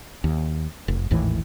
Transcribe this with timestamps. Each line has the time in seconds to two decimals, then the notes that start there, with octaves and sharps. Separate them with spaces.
0.24 D#2
0.88 F1
1.11 G#1 D#2 A2 E3